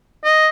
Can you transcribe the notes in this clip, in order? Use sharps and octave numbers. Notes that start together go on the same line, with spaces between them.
D#5